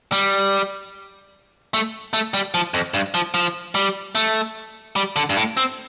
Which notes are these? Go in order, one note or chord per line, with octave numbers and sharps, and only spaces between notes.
G3
A3
A3
G3
F3
F2
G2
F3
F3
G3
A3
G3
D3
G2
A2
C4